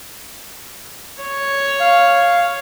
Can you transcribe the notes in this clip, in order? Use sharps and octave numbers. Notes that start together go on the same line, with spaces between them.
C#5
F5